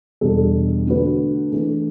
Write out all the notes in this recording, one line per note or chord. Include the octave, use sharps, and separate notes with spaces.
E2 B2 G3 D4 A4
D3 A3 D4 F#4 B4
E3 A3 D4